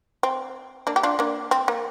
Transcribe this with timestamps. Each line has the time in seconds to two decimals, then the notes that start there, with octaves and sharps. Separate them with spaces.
0.23 C4
0.87 A#3 D4
0.96 G4
1.03 D4 F4
1.19 A#3 D4
1.51 C4
1.68 A#3